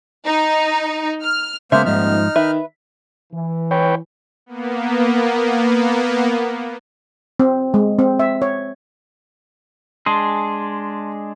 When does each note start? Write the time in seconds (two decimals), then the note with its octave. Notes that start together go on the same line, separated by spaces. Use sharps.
0.25 D#4
1.22 F6
1.72 C#3 G#3 A#3 B3 C5 E5 F6
1.86 D#1 G#2 F3 D#4 F6
2.36 D#3 B4 E5
3.33 E3
3.71 B4 C#5 G5
4.46 A#3 B3
7.40 C4
7.74 G#3
7.99 C4
8.19 E5
8.42 C#5
10.06 G#3 D4 G#4 A5 C6